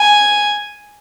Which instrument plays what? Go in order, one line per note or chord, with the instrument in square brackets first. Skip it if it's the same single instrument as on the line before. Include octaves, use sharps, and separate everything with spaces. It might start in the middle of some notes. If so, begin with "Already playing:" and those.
Already playing: [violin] G#5